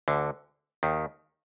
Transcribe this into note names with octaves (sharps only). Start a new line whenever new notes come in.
D2 D3
D#2 D#3